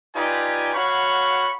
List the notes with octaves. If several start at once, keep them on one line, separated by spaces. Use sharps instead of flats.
D#4 F4 G4 B4 D5 G#5
F#4 C#5 F5 F#5 B5 C#6